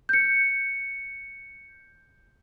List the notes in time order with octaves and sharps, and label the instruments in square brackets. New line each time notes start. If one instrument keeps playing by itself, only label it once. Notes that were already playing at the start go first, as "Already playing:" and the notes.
[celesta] G6 C#7